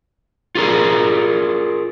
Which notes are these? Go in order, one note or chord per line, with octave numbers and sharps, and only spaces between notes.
F4 G#4 A#4